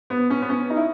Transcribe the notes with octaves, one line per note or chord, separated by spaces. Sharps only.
B3
C#4
B3
C#4
D#4
E4